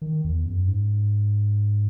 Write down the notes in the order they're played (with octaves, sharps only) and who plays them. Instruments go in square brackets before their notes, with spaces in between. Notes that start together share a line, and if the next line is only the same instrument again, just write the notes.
[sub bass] D#3
E2
F#2
G#2